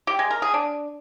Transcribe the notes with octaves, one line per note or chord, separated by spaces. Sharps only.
G4
G#3
A#4
G#4
D4